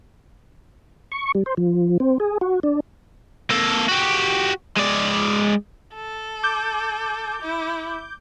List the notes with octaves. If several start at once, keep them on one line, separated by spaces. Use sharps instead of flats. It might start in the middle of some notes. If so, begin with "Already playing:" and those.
C#6
G3
C5
F3
C4
G#4
F#4
D4
A#3 A4
F#4 G4
G#3 D5
A4
D6 G6
E4